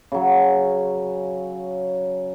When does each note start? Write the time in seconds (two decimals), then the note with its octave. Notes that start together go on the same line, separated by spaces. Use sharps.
0.12 C#3 F#3